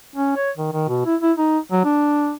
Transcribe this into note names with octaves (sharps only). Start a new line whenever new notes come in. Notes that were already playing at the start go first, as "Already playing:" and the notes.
C#4
C#5
D#3
D#3
B2
E4
E4
D#4
F#3
D4